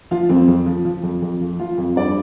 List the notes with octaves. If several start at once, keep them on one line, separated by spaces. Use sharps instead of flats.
F3 F4
F2 C4
F2
F3
F3
F2
F2
F3
F3 F4
F2
G2 D5